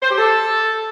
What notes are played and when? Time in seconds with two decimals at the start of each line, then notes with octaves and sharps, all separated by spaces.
0.03 C5
0.10 G4
0.18 A4